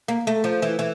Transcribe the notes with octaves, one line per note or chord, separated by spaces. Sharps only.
A#3
A3
F3
E3
E3